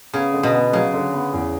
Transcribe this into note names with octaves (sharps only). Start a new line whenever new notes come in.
C#3 B3
D3
B2
B3
C#3 F#3
D3
B3
E2